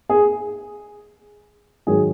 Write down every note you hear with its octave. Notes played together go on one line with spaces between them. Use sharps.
G#4
G#2 D#3 F#3 G#4